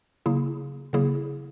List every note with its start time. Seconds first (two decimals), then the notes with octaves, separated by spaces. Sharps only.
0.26 C#3 F#3 A#3 E4 G#4
0.93 C#3 F#3 A#3 E4 G#4